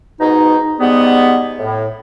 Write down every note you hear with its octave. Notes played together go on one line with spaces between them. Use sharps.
G#2 B2 D#4
G#2 G3 B3
A2